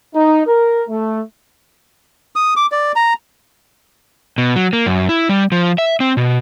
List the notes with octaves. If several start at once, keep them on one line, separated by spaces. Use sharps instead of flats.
D#4
A#4
A3
D#6
D6
D5
A#5
B2
F#3
A#3
F#2
E4
G3
F3
E5
C4
B2